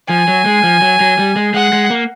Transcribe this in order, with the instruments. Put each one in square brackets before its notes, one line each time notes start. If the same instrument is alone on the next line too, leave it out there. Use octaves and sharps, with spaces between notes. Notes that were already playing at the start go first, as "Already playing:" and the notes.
[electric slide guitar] F3 [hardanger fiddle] G#5
[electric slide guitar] F#3
G#3
F3
F#3
F#3
G3
G#3
[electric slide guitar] G#3 [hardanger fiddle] F#5
[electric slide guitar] G#3
A#3